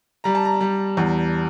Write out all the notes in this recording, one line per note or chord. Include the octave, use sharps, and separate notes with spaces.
G3 A#5
A5
A#5
G3
E2